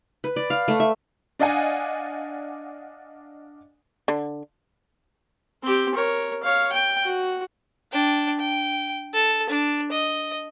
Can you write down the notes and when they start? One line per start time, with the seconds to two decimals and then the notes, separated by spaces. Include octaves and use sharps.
0.24 B4
0.36 D5
0.50 F5
0.68 A3
0.80 E5
1.39 D4 D5 D#5 F5 F#5 G#5
4.08 D3
5.63 C4 G4
5.95 A#4 C#5
6.43 C#5 F5
6.73 G5
7.04 F#4
7.92 D4 G5
8.39 G5
9.14 A4
9.50 D4
9.92 D#5